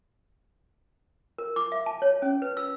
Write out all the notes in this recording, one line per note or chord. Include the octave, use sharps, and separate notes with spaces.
A#4
D6
E5
A5
C#5
C#4
B4
E6